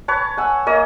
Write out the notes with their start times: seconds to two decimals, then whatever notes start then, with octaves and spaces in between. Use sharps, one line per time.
0.08 B4 C#5 A5
0.37 F#5 G#5 E6
0.66 A#3 C#5 D#5